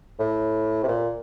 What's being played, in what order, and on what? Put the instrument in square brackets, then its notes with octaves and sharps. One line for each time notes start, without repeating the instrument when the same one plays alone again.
[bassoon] A2
C3
A#2